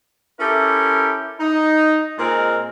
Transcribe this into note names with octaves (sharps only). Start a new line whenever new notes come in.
C#4 E4 G4 A4 A#4
D#4
A#2 G#3 C4 A#4